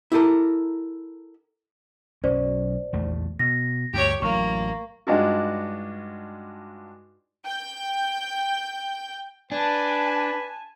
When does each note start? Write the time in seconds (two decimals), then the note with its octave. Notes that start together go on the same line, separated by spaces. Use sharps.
0.12 E4 G4 A4 A#4
2.24 B1 F#3 C#4 C5 D5
2.93 A#1 E2 A3
3.39 B2 A#6
3.94 D2 G2 G4 C#5
4.22 A1 F#3 A#3 C#6
5.07 G2 G#3 D4 D#4 F4 F#4
7.44 G5 G6
9.52 D4 B4 G#5 A5